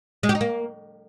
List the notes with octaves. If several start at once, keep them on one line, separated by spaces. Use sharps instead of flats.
G#3
G4
D#4
A#3